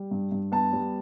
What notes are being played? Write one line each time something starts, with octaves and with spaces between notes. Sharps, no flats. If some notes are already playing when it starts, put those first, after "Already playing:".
Already playing: G3
G2
G2
B3 A5
G3